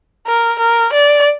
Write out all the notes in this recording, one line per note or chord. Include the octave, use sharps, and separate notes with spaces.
A#4
A#4
D5